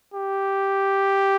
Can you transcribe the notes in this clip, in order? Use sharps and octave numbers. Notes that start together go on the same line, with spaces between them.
G4